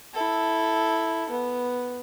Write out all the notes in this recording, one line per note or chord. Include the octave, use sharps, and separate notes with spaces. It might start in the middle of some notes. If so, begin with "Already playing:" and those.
E4 A4
B3